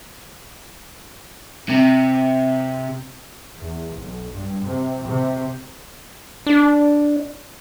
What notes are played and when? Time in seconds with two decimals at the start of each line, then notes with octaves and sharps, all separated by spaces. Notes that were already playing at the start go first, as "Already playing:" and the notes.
1.70 C3
3.58 E2
3.98 B1
4.32 G2
4.65 C3
5.07 C3
6.46 D4